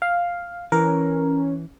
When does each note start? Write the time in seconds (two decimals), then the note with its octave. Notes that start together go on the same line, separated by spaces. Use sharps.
0.02 F5
0.72 E3 C#4 A#4